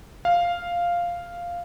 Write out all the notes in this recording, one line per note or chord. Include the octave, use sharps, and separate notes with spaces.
F5